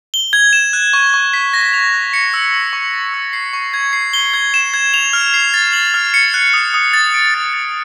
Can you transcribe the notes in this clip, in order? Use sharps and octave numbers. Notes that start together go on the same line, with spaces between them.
G7
G#6
E7
F#6
C#6
C#6
B6
A#6
F7
F#6
C#7
E6
C#6
C#6
A6
E6
C7
C#6
G#6
C7
G7
G#6
E7
G#6
F7
F6
C7
A6
F#7
F6
C#7
F#6
D#6
D#6
A6
D7
A6
A6